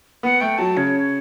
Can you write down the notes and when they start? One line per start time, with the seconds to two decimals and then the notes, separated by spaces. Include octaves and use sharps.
0.23 B3 F#5
0.41 A3 G5
0.58 F#3 A5
0.77 C#3 C#5